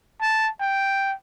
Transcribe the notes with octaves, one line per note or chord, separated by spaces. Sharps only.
A5
G5